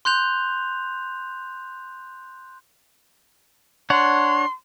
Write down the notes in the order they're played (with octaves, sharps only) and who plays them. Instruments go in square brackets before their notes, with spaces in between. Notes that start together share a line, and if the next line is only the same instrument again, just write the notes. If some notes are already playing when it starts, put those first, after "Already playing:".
[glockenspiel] C6 F#6 G6 F7
[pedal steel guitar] D4 C#5 F#5 [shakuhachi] C6